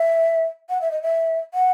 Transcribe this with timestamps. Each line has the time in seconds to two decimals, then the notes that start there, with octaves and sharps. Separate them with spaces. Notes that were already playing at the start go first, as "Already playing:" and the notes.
Already playing: E5
0.70 F#5
0.81 E5
0.91 D#5
1.02 E5
1.54 F#5